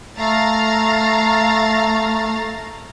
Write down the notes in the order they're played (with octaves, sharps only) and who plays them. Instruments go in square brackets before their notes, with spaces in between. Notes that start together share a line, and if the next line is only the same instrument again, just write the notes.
[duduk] A3 [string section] F5 A#5 A6